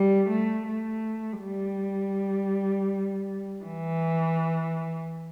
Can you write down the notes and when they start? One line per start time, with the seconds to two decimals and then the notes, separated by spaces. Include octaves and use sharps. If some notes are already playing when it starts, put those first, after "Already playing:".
Already playing: G3
0.30 A3
0.68 A3
1.41 G3
3.65 E3